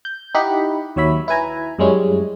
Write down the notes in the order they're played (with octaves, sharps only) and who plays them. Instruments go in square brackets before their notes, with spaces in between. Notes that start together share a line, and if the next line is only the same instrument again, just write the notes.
[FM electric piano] G6
D#4 E4 G4 F#5 B5
D#2 F#3 C#5 E5 B5
E4 B4 G#5 A#5
F#2 G3 G#3 C#4 E4